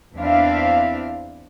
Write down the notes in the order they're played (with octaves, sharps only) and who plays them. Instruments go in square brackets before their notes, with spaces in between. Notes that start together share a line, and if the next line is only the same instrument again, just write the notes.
[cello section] E2 C4 D4 E4 E5 F5